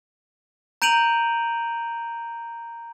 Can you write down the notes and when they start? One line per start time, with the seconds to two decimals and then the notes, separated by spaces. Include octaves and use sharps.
0.82 A#5 G6 D7 D#7 F7 F#7